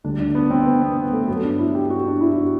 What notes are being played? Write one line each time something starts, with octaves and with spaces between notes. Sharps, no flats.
D2 D3 G3 D4
D4
B3
C4
B3
B3
B3
A3
G2 F#3 B3
D4
E4
G4
F#4
D4
E4
F#4